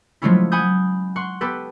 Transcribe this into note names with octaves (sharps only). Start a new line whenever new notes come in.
F3 F#3 G#3 A3 C#4 E4
F#5 G#5 B5 D#6 G6
F#5 C6 C#6
B3 G4 A4 B4